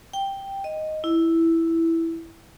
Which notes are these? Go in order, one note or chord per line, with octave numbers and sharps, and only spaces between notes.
G5
D#5
E4